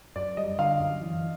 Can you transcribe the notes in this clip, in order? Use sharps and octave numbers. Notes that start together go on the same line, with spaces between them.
F#2 D5
G3 D#5
D3 F5
F#2
E3